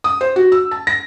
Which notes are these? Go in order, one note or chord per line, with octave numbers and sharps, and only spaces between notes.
D#6
C5
F#4
E6
A5
A#6